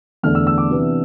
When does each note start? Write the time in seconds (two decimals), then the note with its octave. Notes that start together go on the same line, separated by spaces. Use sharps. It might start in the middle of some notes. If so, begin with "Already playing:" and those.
0.23 E2 D3 A3 D4 F6
0.35 E6
0.47 E6
0.58 D6
0.71 C3 E3 B3 D4